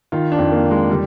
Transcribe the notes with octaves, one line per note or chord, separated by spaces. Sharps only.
D#3 F4
D4
F2
A#3
D#3
G#3
D3 G3